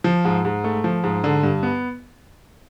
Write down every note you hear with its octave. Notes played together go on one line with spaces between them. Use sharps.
F3
G#2
G#2
A3
F3
G#2
D3
G2
B3